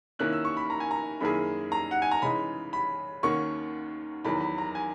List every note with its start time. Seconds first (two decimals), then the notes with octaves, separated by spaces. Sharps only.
0.19 D#3 A#3 C#4 E4 F#6
0.32 E6
0.45 C#6
0.57 B5
0.70 A#5
0.80 G#5
0.91 A#5
1.21 F#2 D#3 A#3 E4 G#4 B5
1.72 A#5
1.91 F#5
2.02 G#5
2.11 A#5
2.22 C#3 E3 G#3 D#4 B5
2.73 B5
3.23 D#2 D#3 A#3 C#4 F#4 C#6
4.25 E2 D#3 F#3 B5
4.41 B5
4.58 A#5
4.75 G#5